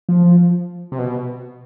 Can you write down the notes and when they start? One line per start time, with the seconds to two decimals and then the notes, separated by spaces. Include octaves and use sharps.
0.09 F3
0.92 C3
0.99 B2